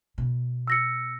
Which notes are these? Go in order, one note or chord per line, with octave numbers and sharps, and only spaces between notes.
B2
E6 A#6 C#7